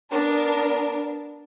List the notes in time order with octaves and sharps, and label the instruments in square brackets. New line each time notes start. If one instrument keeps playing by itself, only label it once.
[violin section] B3 D4 A#4